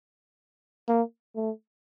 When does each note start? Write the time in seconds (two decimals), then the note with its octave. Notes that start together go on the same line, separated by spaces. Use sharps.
0.88 A#3
1.36 A3